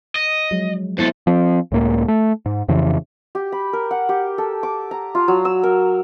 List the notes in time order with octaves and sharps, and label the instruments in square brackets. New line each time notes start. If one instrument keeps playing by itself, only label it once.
[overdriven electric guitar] D#5
[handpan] F3 F#3 G#3
[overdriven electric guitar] D#2 A4 [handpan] B3 E4 C5
[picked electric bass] F3 C4
C#2 A2 A#3
A3
G#2
F2 C#3 E3
[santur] G4
B5
A#4
F#5
G4
A4
D6
A#5
F4
F#3
E6
A#4